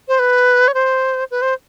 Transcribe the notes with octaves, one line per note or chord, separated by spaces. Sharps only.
C5
B4
C#5
C5
B4
C5